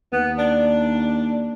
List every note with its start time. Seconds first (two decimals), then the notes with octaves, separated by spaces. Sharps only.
0.12 D#2 B3
0.38 D4